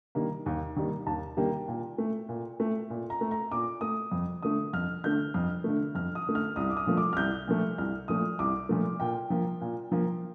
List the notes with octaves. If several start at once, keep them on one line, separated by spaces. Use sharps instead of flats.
D#3 G3 A#3
D#2
D#3 G3 A#3
D#2 A5
D#3 G3 A#3 G5
A#2
A3
A#2
A3
A#2
A#5
A3
A#5
A#2 D6
A3 D#6
F2
D3 A3 D#6
F2 F6
D3 A3 G6
F2 F6
D3 A3
F2 F6
D#6
D3 A3
F6
C2 D#6
D6
D#6
A#2 F3 A3
D6
F6
C2 G6
A#2 F3 A3
C2 F6
A#2 F3 A3 D#6
C2 D6
A#2 F3 A3
A#2 G5
F3 A#3
A#2
F3 A#3